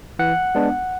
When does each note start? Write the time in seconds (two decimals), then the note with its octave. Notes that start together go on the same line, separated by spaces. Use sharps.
0.19 E3 F#5
0.55 G#3 B3 D4